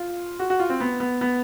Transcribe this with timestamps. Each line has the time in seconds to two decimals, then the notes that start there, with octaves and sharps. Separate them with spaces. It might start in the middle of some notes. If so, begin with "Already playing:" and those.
Already playing: F4
0.39 F#4
0.50 F#4
0.60 F4
0.70 C4
0.80 B3
1.00 B3
1.21 B3